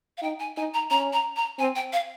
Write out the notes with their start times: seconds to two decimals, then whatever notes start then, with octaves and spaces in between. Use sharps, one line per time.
0.18 F5
0.22 D#4 G5
0.40 G#5
0.57 D#4 G#5
0.74 A#5
0.90 C#4 A#5
1.13 A#5
1.36 A#5
1.59 C4 G#5
1.75 G5
1.93 F5